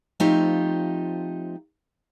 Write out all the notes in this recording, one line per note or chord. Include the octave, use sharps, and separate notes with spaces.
F3 A3 C4 D#4 F4 G4